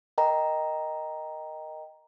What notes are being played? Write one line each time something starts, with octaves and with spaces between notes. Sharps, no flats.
A#4 D#5 G5 A#5